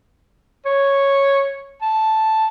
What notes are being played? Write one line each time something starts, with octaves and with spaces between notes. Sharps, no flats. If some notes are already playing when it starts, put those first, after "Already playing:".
C#5
A5